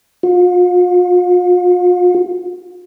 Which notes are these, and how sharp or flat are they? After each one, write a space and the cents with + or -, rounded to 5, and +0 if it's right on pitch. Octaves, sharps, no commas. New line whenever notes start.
F4 +40